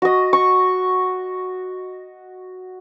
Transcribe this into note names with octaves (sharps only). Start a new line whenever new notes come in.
F#4 D#5
C#6